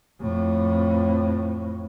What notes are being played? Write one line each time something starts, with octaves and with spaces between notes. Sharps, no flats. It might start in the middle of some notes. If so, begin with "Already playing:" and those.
F2 A2